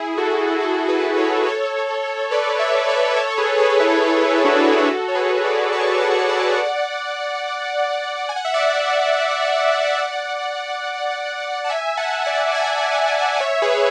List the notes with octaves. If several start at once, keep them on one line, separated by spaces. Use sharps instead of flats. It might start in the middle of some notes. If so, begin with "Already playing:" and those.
Already playing: E4 G#4
F#4 A4
F#4 A4
G#4 B4
A4 C#5
A4 C#5
B4 D5
C#5 E5
B4 D5
A4 C#5
G#4 B4
G#4 B4
E4 G#4
E4
D4 F#4
F#4 A4
C#5
G#4 B4
B4 D5
A5 C#6
F#5 A5
D5 F#5
G#5
F#5
E5
D5 F#5
D5 F#5
A5
E5 G#5
F#5 A5
D5 F#5
E5 G#5
C#5 E5
G#4 B4